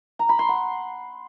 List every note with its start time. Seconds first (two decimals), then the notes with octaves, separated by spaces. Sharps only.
0.19 A#5
0.29 B5
0.39 C6
0.49 F#5